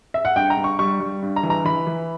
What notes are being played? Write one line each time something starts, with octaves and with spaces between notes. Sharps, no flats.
E5
F#5
G2 G5
A#5
G2
C#6
G3 C#6
G3
G2
A#5
E3
A#5
E3 B5
E3